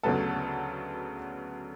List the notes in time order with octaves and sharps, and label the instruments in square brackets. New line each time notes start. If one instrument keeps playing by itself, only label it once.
[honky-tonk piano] D2 C#3 F#3 B3 A4